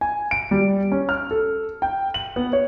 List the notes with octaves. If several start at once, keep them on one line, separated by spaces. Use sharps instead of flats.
G#5
D7
G3
C#4
F6
A4
G5
F#7
B3
C#5